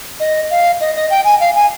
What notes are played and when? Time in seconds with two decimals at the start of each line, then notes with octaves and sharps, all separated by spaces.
0.20 D#5
0.51 F5
0.81 D#5
0.96 D#5
1.10 G5
1.25 G#5
1.40 F5
1.55 G#5